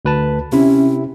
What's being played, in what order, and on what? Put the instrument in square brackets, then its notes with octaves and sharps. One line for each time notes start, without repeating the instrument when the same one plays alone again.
[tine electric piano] D2 B4 A5
[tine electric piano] C3 E4 [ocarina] C#4